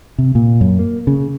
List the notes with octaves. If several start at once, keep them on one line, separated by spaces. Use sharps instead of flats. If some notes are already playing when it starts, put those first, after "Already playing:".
C3
A#2
F#2
A#3
C#3